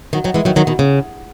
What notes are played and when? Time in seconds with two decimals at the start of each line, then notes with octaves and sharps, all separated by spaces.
0.13 D#3 F#3
0.24 D#3 F#3
0.34 E3 G#3
0.45 D#3 F#3
0.56 D#3 F#3
0.67 B2 D#3
0.79 C#3